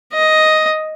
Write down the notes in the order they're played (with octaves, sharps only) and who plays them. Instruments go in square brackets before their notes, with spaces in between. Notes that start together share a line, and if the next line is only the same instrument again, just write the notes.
[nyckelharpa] D#5